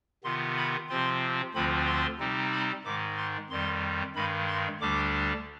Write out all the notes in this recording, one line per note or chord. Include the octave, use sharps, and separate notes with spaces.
C3 D#3 B3 F4 C6
B5
C3 F3 C4 F4 C6
D2 D3 F3 C4 F4 B5
C6
C3 G3 C4 D#4
B5
G#2 D#3 G#3 D6
C6
F2 D#3 G3 C6
G2 D#3 G#3 B5
C6
D2 D3 G3 D4 D6